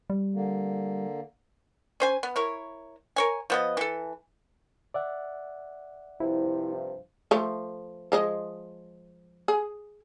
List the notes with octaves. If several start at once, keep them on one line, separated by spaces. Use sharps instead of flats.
G3
D3 A#3
C#4 C5 G#5
B3
E4 A#4 C#5
A#4 C#5 G#5
F3 B3 D#5
E3 A4
D5 E5 F#5
G2 C3 F3 E4
F3 A3
F3 G#3 D#5
G#4